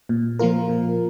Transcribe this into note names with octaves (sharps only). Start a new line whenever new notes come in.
A#2
F3 A#3 F4 A#4
A#2